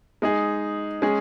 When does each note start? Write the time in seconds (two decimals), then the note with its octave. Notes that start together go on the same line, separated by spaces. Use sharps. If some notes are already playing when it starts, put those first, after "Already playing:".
0.22 G#3 D#4 G#4
1.02 G#3 C#4 G#4